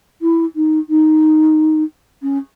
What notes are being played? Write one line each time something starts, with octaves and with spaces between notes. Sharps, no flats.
E4
D#4
D#4
C#4